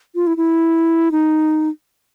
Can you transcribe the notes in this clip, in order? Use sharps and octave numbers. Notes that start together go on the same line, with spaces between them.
F4
E4
E4
D#4